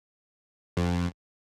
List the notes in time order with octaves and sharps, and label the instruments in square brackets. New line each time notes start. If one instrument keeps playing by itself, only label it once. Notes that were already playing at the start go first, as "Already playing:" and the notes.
[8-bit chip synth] F2